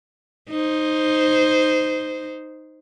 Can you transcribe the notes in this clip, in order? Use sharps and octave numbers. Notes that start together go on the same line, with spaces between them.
D#4 C5